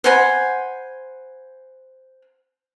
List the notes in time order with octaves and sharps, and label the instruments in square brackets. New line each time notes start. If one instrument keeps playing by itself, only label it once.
[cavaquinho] C5 F#5 G#5 B5